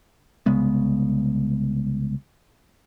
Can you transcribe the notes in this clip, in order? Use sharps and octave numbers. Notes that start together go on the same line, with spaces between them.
C2 C#3 G#3 B3